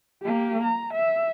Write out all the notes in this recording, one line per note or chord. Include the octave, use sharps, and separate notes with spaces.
A#3 G4
A#5
E5